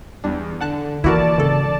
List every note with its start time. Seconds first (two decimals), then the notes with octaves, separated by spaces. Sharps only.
0.24 E2 G3 D4
0.61 D3 F#5 A5 F#6
1.04 D1 E3 A#3 E4 F#4 A#4 D5 A5
1.38 A#1 G#2 C#3 A4